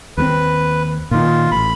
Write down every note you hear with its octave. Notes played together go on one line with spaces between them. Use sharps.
D#2 G#3 C4 B4
A#2 D#3 F4
A1 B5